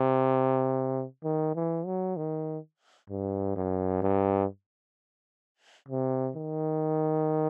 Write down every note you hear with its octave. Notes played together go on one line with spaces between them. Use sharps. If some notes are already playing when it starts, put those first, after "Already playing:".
Already playing: C3
D#3
E3
F#3
D#3
G2
F#2
G2
C3
D#3